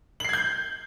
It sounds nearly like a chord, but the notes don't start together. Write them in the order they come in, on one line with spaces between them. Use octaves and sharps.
F#7 C7 G#6 G6